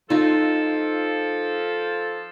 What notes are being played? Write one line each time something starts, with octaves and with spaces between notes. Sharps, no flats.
F3 D#4 F4 A4